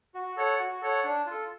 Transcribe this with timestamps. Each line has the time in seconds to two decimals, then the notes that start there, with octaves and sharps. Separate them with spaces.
0.14 F#4
0.37 A4 C#5 F#5
0.60 F#4
0.82 A4 C#5 F#5
1.04 D4
1.26 F4 A4